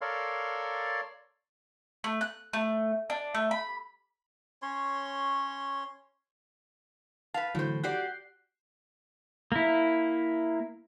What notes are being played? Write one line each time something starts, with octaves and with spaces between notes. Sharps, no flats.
A4 A#4 C#5 D5 F5 C6
A3
F#6
A3
D4
A3
B5
C#4 C#5 C6
B4 F5 A5
A2 D3 E3 F#3 C5
F#4 G4 D5 F#6 G6 C7
A#3 E4